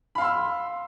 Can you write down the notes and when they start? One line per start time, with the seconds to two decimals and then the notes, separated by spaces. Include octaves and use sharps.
0.15 B5
0.18 F5
0.21 C6
0.24 E6